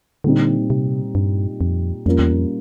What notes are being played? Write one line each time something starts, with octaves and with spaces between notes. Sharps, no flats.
A#2 D3 G3 C4 D#4
C3
G2
F2
F2 G3 A#3 C#4 F4 A#4
E2
F2